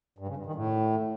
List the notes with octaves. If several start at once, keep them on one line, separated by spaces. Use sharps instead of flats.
G2
C#3
G2
D#3
A2